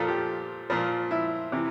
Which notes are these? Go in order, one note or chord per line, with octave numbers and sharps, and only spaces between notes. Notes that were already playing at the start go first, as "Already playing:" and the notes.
Already playing: A#2 F3 A4
G4
A#2 F3
E4
C3 E3